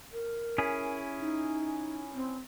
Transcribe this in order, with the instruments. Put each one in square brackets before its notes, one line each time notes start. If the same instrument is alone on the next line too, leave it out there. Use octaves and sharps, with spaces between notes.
[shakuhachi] A#4
[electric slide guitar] C#4 E4 G#4
[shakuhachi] D#4
C4